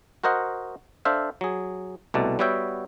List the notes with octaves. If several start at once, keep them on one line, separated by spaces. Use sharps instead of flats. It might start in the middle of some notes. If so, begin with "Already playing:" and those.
F#4 A#4 C5 D#5 F#5
D4 A4 C5 E5 F5
F#3 G#4
C2 B2 A3 D5
G3 B3 F#4 C#5 E5 G5